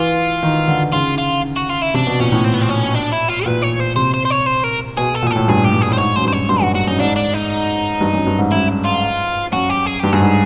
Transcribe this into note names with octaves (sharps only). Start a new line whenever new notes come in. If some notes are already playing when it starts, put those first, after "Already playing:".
Already playing: E3 F4
D#3
D3
C#3 F4
F4
F#4
F4
E4
C3 D4
B2
A#2 C#4
A2
C4
B3
C4
C#4
D4
E4
F4
A#2 B4
C#5
C5
C3 C5
C5
C5
C#5
C5
A#4
B2 G#4
A4
A#2
G#4
A2 A4
G2 G#4
G4
G2
G#4
A2 C5
G#2 C#5
F#2 C5
G2
C5
C#5
G2 C5
G2 F#4
G2 F#4
F#2 D#4
G#2 D4
D4
D#4
G2
F#2
G2
G#2
F#2 E4
F4
F#2 F#4
G4
G#4
G2 G4
G2 G#4
G#2